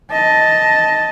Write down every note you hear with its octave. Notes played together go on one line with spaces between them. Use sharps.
D#5 A5